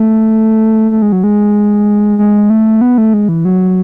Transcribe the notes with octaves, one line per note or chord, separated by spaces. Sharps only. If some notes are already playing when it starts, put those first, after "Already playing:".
Already playing: A3
A3
G#3
F#3
G#3
G#3
A3
B3
A3
G#3
E3
F#3